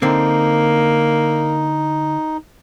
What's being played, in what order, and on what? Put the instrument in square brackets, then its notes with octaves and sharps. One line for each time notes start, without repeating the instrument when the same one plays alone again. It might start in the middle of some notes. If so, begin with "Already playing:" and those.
[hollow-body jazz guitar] D3 C4 [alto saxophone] A#3 [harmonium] D#4